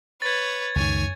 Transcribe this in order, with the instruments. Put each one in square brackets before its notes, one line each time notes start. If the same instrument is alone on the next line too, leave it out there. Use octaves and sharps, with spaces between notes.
[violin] B4 C#5 [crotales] G#6 A6
[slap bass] C#2 D#3 [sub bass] F#2 [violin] C#5 G#5